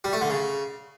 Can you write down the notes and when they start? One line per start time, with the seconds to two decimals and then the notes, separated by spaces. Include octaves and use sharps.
0.04 G3
0.13 A3
0.21 D3
0.30 C#3